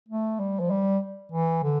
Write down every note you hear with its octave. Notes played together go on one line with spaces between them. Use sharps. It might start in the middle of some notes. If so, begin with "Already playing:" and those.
A3
G3
F3
G3
E3
D3